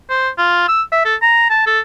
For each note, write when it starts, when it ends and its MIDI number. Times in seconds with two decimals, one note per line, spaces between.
0.10 0.29 72
0.38 0.67 65
0.68 0.82 88
0.92 1.05 76
1.05 1.15 69
1.22 1.48 82
1.50 1.65 81
1.67 1.80 69